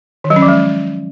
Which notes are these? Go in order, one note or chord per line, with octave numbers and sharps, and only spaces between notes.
D#3
F#3
C#4
F3
G#3